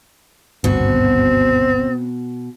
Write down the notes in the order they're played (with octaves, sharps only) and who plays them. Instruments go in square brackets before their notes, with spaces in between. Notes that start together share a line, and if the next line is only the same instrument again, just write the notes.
[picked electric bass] G#1 D2 G2 [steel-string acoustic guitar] B2 F#4 [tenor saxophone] C4